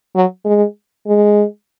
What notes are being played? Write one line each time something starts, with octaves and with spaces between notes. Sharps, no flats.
F#3
G#3
G#3